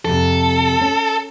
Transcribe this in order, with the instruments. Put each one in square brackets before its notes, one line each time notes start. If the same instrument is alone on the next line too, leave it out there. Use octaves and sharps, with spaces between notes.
[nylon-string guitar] F2 C3 [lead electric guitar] A4
[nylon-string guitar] C#4